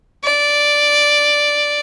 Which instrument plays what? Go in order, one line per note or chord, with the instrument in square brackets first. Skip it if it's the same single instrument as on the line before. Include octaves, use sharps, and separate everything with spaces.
[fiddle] D5